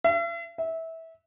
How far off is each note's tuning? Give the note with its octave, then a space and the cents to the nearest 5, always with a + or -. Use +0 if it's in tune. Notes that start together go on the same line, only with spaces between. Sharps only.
E5 +45
E5 -20